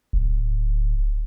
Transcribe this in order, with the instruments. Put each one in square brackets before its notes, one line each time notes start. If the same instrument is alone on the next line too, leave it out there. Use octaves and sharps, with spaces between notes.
[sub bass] D1